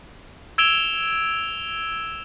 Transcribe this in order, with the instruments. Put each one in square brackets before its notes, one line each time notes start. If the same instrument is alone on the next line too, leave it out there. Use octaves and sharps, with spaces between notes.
[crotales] E6 G#6 D7 E7 F7 G7